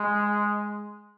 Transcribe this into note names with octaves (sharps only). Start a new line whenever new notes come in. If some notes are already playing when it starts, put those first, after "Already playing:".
Already playing: G#3